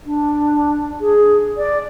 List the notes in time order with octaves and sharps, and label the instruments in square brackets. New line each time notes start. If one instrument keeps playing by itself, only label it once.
[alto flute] D4
G#4
D5